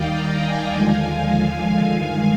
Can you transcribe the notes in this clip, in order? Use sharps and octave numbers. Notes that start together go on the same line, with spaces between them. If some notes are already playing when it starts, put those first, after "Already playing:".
Already playing: D#2 D#3 G3 D5 D#5 F5 G5
G5 A#5
F5 G#5
D#2 D3 F3 G#3
G2 D#3 G#3 F5 G#5